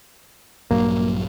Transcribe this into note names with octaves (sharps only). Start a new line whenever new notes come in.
A#1 G2 F#3 A#3